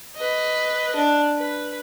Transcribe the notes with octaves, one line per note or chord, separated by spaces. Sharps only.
B4 D#5
D4
B4